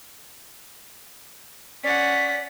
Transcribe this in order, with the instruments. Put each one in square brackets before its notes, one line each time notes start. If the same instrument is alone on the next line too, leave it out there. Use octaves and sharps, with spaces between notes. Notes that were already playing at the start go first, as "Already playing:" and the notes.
[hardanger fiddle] C#4 F#5 [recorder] D5 [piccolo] B6